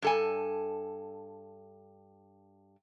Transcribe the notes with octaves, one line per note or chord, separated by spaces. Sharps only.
G2 A4 G#5